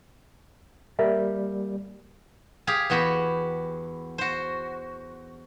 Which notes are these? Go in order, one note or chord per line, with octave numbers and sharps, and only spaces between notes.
G3 A#3 A#4 D5 E5
G4 G#4 F5
E2 B3 F#4 G4
F#4 C5